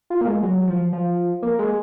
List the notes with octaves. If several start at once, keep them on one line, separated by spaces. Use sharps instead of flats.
F4
A#3
G#3
F#3
F3
F3
A#3
G#3